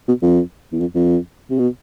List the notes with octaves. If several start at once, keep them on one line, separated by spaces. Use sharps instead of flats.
B2
F2
E2
F2
F2
C3
B2